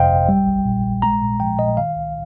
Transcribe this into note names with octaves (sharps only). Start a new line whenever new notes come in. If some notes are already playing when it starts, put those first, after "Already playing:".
Already playing: G1 F2 C3 C5 D#5 F5 G5
G1
G3
A#1
A#2
A#1
G#3 A#5
A#2
F3 G5
A#2 D#5
D#3 F5
C2